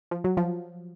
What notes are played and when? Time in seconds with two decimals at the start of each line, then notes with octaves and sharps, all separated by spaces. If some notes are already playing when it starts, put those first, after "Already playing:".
0.11 F3
0.24 F#3
0.37 F3